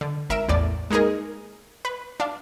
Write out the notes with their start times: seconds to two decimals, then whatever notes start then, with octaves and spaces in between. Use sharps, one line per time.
0.01 D3
0.30 G#1 A#4 E5 D7 E7
0.48 A1 E2 A2 D5
0.90 G#3 A#3 D#4 G#4 A#4
1.85 B4
2.20 D4 F5